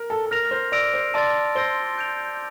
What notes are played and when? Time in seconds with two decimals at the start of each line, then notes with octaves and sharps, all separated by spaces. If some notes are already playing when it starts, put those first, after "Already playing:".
Already playing: A#4
0.10 A4
0.26 A4
0.31 A#4 F6 A#6 F7
0.51 C5
0.72 D5 E6 A#6 D7 F7
0.94 C5
1.14 D5 A5 C6 E6 A6
1.55 C5 E6 A#6 D7 G7
1.98 G6 D7 F7